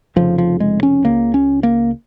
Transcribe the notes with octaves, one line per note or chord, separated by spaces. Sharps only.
F1 F2 C#3 F3
F3
G#3
C#4
C#2 C#3 A#3
C#4
A#3